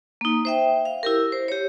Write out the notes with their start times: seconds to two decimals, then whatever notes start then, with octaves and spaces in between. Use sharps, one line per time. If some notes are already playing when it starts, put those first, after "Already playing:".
0.21 A#3 D#4
0.45 C5 E5 G5
0.85 F5
1.03 E4 G4 A#4
1.32 C5
1.48 G4 C#5